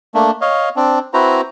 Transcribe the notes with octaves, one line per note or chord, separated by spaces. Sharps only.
A3 A#3 D4
C#5 D#5 F5
C4 D4
C4 E4 F#4 B4 C5 A#5